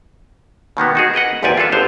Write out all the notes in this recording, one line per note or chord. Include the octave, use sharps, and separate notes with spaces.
B2 D#3 A#3 B3
D#4 F#4 G#4
A#4 B4 D#5 F#5
G#1 E2 A#2 G4 D5 G#5
A#3 F4 G#4 A4 B4
G1 D3 C5 F5